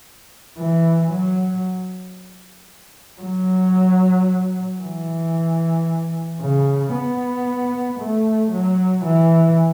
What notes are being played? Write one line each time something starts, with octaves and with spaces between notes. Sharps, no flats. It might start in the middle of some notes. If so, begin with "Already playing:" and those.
E3
F#3
F#3
E3
C#3
B3
A3
F#3
E3